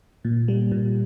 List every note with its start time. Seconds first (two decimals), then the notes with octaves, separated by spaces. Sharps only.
0.25 A#2
0.48 G3
0.72 A#2